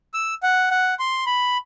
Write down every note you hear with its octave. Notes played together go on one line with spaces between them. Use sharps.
E6
F#5
F#5
C6
B5